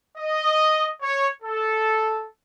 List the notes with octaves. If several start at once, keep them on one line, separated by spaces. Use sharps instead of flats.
D#5
C#5
A4